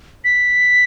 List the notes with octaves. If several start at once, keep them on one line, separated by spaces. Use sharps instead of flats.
B6